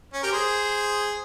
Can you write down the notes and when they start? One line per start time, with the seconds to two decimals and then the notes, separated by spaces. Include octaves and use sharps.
0.13 C#4
0.22 G4 A#4
0.32 G#4 C5